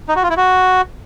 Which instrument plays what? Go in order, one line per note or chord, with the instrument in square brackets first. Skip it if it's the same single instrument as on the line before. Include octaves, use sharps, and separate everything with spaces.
[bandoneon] D#4
F#4
F4
E4
F#4